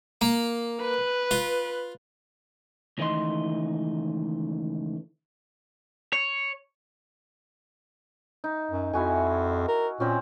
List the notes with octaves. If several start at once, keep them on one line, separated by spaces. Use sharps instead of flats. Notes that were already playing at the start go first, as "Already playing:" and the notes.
A#3
B4
F4
C#2 D#3 E3 A3 D#5 C6
C#5
D#4
F#2
F2 E4 F#4 G#5
A#4
A#2 C4 C#4